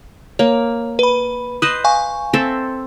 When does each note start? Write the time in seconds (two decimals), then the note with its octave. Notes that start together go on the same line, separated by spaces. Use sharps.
0.39 A#3 C#5
0.99 B4 B5
1.62 B4 C5 D#5 D#6
1.84 F5 G#5 C#6
2.33 C4 A4 E5